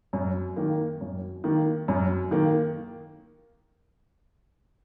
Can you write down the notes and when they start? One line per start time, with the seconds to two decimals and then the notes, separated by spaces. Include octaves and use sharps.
0.13 F#2
0.56 D#3 A#3
1.01 F#2
1.44 D#3 A#3
1.88 F#2
2.31 D#3 A#3